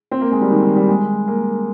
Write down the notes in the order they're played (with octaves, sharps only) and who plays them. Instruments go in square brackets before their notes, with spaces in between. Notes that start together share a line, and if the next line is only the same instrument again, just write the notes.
[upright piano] C4
A#3
G#3
G3
D#3
D#3
G3
G#3
A#3